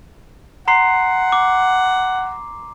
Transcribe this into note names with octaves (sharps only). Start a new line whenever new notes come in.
F#5 A#5 C6 C7
D6